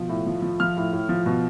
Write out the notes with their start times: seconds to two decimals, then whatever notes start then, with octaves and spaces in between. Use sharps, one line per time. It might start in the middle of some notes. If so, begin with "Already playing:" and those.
Already playing: B2 F3
0.09 A2
0.26 F3
0.42 F3
0.60 F3 F6
0.77 A2
0.93 A2
1.09 F3
1.26 B2